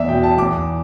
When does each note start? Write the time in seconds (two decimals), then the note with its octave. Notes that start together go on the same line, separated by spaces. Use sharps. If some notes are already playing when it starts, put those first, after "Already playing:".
Already playing: E2 D5 E5
0.08 B2 G5
0.23 A5
0.38 E2 D6